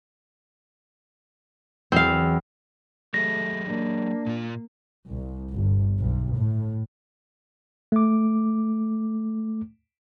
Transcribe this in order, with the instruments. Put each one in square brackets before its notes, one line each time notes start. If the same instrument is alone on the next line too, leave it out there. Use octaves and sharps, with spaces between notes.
[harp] E2 F#3 [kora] C4 F5
[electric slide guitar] F#3 G4 G#4 [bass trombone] A3 [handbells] A#6
[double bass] A#3 [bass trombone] D4
[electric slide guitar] A#2 F4
[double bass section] C2
G1
B1
A2
[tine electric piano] A3 D6